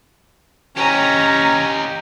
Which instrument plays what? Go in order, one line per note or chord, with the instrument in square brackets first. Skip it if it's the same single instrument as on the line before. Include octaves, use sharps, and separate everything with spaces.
[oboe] C#4 [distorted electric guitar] G4 D#5 [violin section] A#5